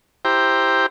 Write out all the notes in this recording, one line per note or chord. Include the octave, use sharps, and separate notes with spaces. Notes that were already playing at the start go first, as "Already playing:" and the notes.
E4 G4 C5 G5 A#5